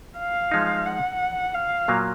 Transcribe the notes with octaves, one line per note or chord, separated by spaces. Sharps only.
F5
F3 G#3 D#4
F#5
F5
A#2 F#3 A#3